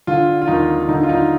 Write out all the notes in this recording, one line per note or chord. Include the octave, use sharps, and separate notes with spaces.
D3 F4
F4
D#2 D#4
D3 D#4
F4
D#4